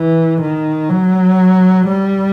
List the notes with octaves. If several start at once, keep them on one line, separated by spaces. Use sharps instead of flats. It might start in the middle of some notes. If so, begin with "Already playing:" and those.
Already playing: E3
D#3
F#3
G3